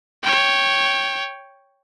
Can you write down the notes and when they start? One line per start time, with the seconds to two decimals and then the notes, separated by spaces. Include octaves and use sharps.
0.23 C#5 G5